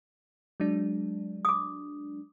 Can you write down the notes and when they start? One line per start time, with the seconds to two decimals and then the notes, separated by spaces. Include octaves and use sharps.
0.60 F#3 G#3 D4
1.45 D6 D#6